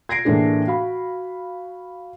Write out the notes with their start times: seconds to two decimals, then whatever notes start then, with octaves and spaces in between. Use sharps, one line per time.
0.09 G#6 A#6 C7 D7
0.25 A2 E3 A#3 D4 G#4
0.67 F#4 F5 B5